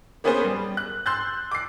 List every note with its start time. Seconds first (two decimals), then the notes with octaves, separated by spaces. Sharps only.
0.24 A#3 B3 C#4 G#4 B4 C5
0.45 G3
0.77 F#6
1.06 C6 E6 F#6 G6 A6
1.52 D6 C7